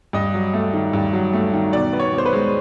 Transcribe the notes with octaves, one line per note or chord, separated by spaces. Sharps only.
G2 D#5
F#3
A3
D#3
G2
F#3
A3
D#3
B2 D5
B3
C#5
B2
C5
B4
G#3